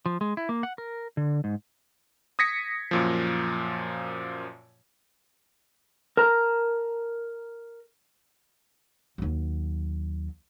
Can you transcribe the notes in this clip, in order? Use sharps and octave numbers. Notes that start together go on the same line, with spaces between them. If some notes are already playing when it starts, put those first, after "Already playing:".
F3
G#3
E4
A#3
F#5
A#4
D3
G#2
D#6 G#6 A#6 B6 C#7
F#2 A#2 F3
A#4 A5 A#5
D#2 F#3